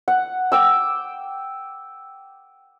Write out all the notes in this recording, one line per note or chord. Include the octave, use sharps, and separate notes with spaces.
F#5
G5 D6 E6